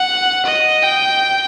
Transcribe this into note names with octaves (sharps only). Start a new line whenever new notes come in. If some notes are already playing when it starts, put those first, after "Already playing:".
Already playing: F#5
D#5
G5